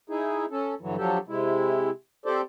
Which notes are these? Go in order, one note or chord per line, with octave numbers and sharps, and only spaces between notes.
D#4 E4 G#4
C#4 A4
G2 D3 E3 F#3
F3 F#3 D4 G4 A4
C3 G#3 E4
C4 G4 A4 C5 D5